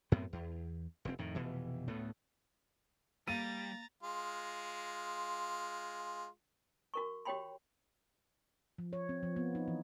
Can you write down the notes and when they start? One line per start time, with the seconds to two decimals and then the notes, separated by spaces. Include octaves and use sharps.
0.12 F#2 A2 B3 C4
0.33 E2
1.05 F1 G#2 C4
1.19 F2 A2 D#3
1.35 F1 B2 E3
1.88 D2 A2 A3 B3
3.28 G3 A#3 A#5 A6 D#7
4.03 G#3 F4
6.94 F#4 A#4 C#6
7.25 F#4 G4 C#5 G5 B5 C6
8.78 F3
8.93 C#5
9.09 C4
9.23 F3
9.36 B3
9.55 D#4
9.68 E3